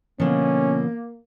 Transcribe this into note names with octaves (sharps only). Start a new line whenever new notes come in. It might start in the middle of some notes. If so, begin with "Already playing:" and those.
B2 D3 F3 A#3 C#4